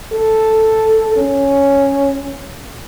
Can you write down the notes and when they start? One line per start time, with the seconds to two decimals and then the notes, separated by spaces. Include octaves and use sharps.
0.12 A4
1.16 C#4